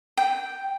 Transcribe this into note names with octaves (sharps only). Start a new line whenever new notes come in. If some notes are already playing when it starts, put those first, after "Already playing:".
G5